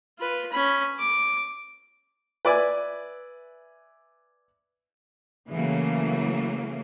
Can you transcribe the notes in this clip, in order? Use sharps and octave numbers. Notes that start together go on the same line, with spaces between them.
F4 B4
C#4 B5
D6
B4 D5 E5 G#5
C#3 E3 F#3 A3 A#3